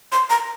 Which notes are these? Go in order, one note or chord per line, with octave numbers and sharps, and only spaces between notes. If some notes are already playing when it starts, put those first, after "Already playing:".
C6
A#5